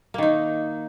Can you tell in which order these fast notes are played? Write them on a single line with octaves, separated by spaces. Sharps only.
A#3 D#3 D#4